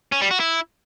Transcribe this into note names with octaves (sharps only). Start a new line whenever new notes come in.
C#4
G3
F#4
E4